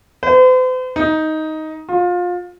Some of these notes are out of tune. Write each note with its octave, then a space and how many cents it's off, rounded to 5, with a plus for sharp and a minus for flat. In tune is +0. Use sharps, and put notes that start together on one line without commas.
C5 -45
D#4 +10
F4 +25